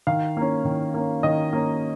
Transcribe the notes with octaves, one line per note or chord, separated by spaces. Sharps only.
D#3 F5
A#3 C#4
D#3
A#3 C#4
D#3 D#5
A#3 C#4